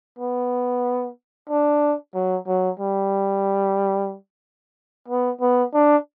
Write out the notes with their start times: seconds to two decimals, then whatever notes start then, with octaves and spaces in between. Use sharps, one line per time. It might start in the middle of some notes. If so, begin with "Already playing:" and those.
0.19 B3
1.49 D4
2.15 F#3
2.47 F#3
2.80 G3
5.08 B3
5.41 B3
5.74 D4